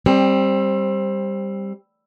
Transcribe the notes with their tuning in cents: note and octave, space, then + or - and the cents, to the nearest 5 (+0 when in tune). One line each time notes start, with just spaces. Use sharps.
G3 +10 C4 +20